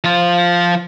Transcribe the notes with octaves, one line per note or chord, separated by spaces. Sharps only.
F3 F4